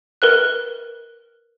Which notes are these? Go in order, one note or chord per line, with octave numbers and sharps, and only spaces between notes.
A#4 B4 F#6